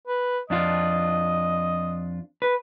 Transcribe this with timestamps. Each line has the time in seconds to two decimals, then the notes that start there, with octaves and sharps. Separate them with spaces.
0.07 B4
0.50 F2 D4 F4 D#5
2.42 B4